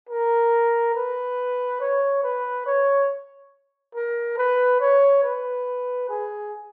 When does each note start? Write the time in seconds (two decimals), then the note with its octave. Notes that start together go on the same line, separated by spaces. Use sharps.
0.09 A#4
0.95 B4
1.80 C#5
2.23 B4
2.66 C#5
3.95 A#4
4.38 B4
4.80 C#5
5.23 B4
6.09 G#4